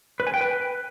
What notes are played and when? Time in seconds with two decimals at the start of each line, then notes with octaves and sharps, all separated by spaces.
0.20 B4
0.27 G#5
0.34 G5
0.41 B4